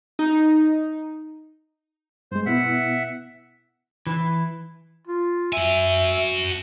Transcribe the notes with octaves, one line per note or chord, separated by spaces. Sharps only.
D#4
G2 G#3 C5
B2 B3 E4 E5 F#5
E3
F4
F#4 E5 G#5